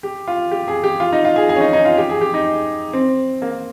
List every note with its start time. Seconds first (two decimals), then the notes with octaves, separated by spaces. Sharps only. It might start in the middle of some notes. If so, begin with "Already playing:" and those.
0.03 G4
0.28 F4
0.51 G4
0.68 G#4
0.84 G4
1.00 F4
1.12 D#4
1.25 F4
1.36 G#4
1.49 G#4
1.56 C#4
1.61 D#4
1.73 D#4
1.85 F4
1.97 G4
2.09 G#4
2.21 G4
2.34 D#4
2.93 C4
3.42 A#3